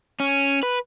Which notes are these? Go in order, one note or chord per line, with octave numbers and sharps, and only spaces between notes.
C#4
B4